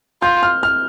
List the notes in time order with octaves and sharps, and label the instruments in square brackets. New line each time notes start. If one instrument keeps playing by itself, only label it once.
[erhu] F4 [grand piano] G6
[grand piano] F6
F6